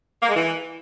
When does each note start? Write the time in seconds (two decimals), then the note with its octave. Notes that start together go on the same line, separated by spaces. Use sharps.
0.23 A#3
0.29 G#3
0.36 E3